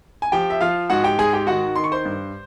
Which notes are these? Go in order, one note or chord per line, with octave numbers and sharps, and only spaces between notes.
G#5
F3 G4 G5
E5
F3 F4 F5
G#2 F#4 F#5
G4 G5
G#2 G#4 G#5
G4 G5
D#3 F#4 F#5
D#3 C6
C#6
C5 C6
G2